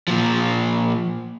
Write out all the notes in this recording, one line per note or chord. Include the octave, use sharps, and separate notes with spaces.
A#2 F3